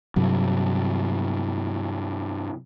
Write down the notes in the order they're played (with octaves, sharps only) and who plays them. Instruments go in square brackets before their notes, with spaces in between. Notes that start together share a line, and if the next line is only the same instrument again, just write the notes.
[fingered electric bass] G2 C3 F#3